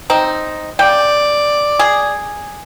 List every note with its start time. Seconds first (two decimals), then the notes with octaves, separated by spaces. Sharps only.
0.10 C4 D#4
0.79 C#3 D5 G5
1.79 G#4